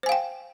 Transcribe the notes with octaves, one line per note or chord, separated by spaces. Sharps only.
C5 F5 G5 G#5